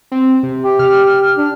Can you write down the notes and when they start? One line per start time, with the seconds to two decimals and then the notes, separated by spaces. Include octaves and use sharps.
0.12 C4
0.43 C3
0.63 G4
0.79 F6
1.37 D4